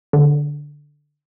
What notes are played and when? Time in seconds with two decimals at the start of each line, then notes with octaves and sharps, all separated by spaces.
0.13 D3